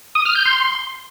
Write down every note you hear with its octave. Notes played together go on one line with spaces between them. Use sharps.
D#6
F6
G6
C6